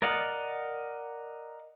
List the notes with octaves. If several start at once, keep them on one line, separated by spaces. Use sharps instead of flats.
A#4 D5 D#5 F5 F#5